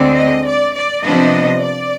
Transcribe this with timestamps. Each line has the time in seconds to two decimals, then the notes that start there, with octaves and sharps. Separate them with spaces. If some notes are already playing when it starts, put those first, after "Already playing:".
Already playing: D2 D3 G#3 C4
0.15 D#5
0.45 D5
0.75 D5
1.03 C3 F3 B3 D4 D#5
1.62 D5